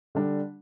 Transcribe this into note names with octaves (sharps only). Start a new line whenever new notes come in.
D3 G3 D4